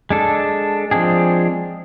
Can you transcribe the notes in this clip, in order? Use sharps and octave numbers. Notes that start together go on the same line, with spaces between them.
G#3 D4 A4
F3 G#3 C4 D4 G#4